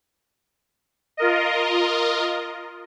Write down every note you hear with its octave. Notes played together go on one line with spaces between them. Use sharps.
F4 A#4 D#5